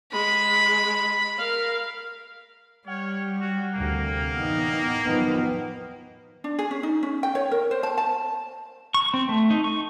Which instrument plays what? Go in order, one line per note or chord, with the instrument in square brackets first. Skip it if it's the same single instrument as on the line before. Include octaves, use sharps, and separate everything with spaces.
[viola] G#3 [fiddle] B5
[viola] A#4 F5
[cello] G3 [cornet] C#5 [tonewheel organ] F#5 G5 F6
[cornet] F#4
[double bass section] D2 C3 [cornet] A#3
[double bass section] E2 A2 [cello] B3 D#4
[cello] D#3 [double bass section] F3 F#3 B3
[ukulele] D4
G#4
C#4
D#4
C#4
G5
C#5
A#4
C5
A5
A5
[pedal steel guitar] C#6
C4
A3
D#4
C#6